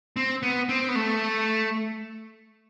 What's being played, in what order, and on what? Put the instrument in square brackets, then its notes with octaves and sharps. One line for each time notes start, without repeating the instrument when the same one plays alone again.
[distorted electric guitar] C4
B3
C4
B3
A3